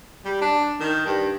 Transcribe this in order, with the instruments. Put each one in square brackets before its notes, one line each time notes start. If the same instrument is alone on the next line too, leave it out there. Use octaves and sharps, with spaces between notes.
[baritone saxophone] G3
D4
D#3
G2